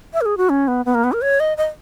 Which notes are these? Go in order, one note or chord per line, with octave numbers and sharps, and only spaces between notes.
E5
A#4
G#4
F#4
C#4
B3
B3
A#3
B3
A#4
C#5
D#5
D#5